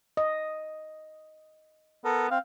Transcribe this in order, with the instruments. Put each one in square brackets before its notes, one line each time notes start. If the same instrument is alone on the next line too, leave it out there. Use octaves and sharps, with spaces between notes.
[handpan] D#5
[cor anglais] B3 [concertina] A4 A#4
[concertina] C4 [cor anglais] F5